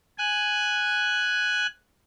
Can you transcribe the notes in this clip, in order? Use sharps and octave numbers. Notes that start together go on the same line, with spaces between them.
G#5 F#6